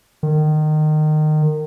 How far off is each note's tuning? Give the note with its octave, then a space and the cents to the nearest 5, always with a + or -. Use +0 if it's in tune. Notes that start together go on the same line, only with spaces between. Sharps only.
D#3 -25